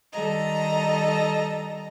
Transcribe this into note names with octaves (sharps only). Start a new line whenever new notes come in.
D#3 G3 A4 D#5 A#5